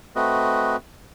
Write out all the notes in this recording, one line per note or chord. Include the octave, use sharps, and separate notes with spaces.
A3 C4 F#4 B4 D#5